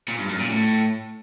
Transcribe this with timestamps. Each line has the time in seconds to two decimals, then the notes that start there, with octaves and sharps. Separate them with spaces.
0.08 A#2
0.19 G2
0.29 F#2
0.40 A#2
0.50 A2